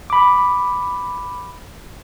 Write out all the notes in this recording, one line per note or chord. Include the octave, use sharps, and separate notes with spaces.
B5 D6